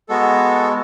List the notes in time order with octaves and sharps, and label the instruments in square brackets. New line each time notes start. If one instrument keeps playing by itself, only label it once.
[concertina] G#3 B3 F#4 A4